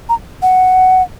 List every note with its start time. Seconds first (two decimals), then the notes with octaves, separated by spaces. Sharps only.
0.09 A#5
0.42 F#5